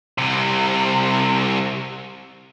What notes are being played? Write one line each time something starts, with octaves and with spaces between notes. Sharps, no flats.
C2 C3